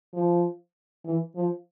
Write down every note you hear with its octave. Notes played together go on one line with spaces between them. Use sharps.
F3
E3
F3